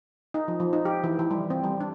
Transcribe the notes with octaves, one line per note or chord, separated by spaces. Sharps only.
D#4
F3
F3
D#4
G4
E3
E3
G3
C4
G3
D4